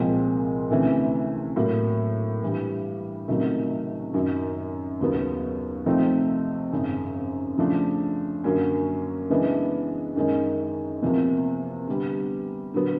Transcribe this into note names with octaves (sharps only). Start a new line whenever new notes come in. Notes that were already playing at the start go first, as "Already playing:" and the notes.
Already playing: C2 A#2 F3 G#3 C4
D2 C3 E3 A3 C#4
A2 F#3 A#3
G2 E3 G3
C#2 C3 D#3 F#3 A3
F#2 D#3 F#3
D#2 C#3 F#3 B3
C3 F3 A3 C4 D#4
G#1 F#2 C#3
C#3 F3 A3 D4
F#2 D3 F#3 A#3 C#4
C#3 E3 G#3 B3 D4
F#2 D#3 G#3 C#4
E2 C3 F3 A#3
D3 G3 B3
D3 F#3 B3